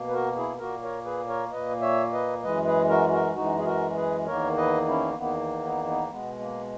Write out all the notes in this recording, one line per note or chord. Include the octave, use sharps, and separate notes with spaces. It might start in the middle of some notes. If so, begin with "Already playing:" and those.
Already playing: B2 A#3
B4
F#4 A#4
E4 G#4
A#2 A#3 F#4 A#4
A#4 C#5
G#4 B4
A#4 C#5
A#2 A#3 B4 D#5
C#5 E5
B4 D#5
F#2 E3 G#3 B4 D#5
G#4 B4
F#4 A#4
F#4 A#4
F#2 E3 G#3 D#4 F#4
G#4
F#4 A#4
G#4 B4
E2 D#3 A#3 A#4 C#5
B4 D#5
C#4 E4
E2 D#3 A#3 B3
B3 D#4
B3 D#4
B2 G#3 B3
A#3